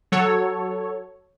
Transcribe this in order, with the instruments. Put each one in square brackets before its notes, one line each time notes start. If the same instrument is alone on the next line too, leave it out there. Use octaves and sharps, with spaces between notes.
[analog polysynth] F#3 A4 C#5